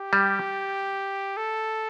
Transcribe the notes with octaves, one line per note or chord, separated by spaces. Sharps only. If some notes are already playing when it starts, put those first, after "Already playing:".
Already playing: G4
G3
A4